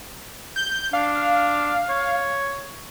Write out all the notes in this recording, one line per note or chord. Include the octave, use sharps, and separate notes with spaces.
G6
D4 F5
C#5